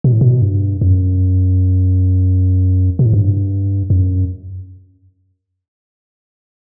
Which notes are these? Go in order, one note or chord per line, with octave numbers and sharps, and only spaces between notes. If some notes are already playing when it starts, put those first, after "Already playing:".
B2
A2
B2
G2
F#2
B2
A2
G2
F#2